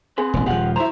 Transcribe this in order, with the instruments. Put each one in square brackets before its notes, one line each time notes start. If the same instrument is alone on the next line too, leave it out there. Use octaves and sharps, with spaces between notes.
[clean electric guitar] C4 B4 [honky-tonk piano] G#4
[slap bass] E1 A1
[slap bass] D#1 F3 [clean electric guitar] G4 F5 F#5
[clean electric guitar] C#2 F#3 A#5 [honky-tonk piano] E4 C5